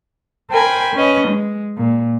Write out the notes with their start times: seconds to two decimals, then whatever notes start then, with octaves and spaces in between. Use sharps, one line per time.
0.51 A#4 C5 G5 G#5 B5
0.96 C#4 B4 D#5
1.28 G#3
1.77 A#2